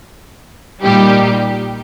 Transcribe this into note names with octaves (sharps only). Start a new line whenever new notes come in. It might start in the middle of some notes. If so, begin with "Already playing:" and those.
A#2 G3 D#4 G4